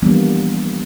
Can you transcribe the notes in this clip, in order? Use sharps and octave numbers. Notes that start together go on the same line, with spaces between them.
E3 F3 G3 A#3 B3 D4